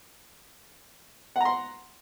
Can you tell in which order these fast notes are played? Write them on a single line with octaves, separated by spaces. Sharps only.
F#5 A#5 C6